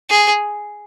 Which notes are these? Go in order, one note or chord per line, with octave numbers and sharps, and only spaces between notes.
G#4